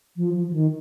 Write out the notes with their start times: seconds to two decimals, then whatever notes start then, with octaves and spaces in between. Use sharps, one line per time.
0.17 F3
0.35 F3
0.48 F3
0.53 D#3